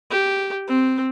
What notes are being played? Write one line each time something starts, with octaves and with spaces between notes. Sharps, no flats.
G4
C4